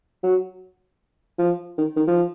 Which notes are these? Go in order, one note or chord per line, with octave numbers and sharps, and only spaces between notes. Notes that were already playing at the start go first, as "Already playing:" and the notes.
F#3
F3
D#3
D#3
F3